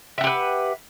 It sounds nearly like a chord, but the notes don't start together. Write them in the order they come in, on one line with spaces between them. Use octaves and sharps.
E5 F#5 G4 B4